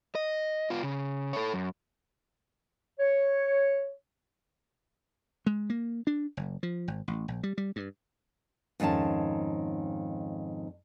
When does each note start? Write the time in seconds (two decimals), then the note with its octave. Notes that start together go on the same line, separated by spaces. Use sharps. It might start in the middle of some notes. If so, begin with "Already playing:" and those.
0.15 D#5
0.70 B3 F4
0.83 C#3
1.33 A4 C#5
1.54 F#2
3.00 C#5
5.46 G#3
5.70 A#3
6.07 D4
6.37 F#1
6.63 F3
6.88 G#1
7.08 A1
7.28 A#1
7.43 G3
7.58 G3
7.76 G2
8.80 F2 G#2 D#3 C#4 A5